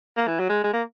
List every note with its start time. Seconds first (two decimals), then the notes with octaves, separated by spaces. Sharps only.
0.17 A#3
0.27 E3
0.39 F#3
0.49 G#3
0.64 G#3
0.73 A#3